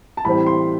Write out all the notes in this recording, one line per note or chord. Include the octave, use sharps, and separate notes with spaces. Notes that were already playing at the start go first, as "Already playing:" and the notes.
A5
A2 E3 G3 C4 E4 B5
C6